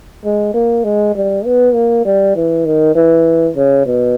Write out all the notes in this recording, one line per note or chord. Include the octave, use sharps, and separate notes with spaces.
G#3
A#3
G#3
G3
B3
A#3
G3
E3
D#3
E3
C#3
B2